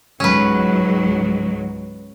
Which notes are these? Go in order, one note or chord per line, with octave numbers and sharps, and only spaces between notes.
C#2 G#2 F#3 C#4 B4